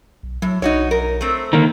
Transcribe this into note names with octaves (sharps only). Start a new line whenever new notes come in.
B1
A2 F#3
B1 D#4 F#4 C#5
A#4
A3 C4
D3 D#3 A#3